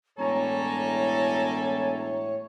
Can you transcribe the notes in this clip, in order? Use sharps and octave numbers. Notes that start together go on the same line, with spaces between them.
E1 A2 G3 A4 C#5 G#5 A#5